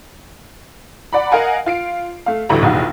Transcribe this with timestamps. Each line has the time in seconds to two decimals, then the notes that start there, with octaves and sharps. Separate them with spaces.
1.13 D5 F#5 A#5 B5
1.32 A#4 D#5 F5 F#5 G#5
1.66 F4 C7 D7
2.26 A3 F5
2.49 A1 D2 G3 A3 E4 A#5
2.62 F1 A#1 E2 D#4 F#4 F5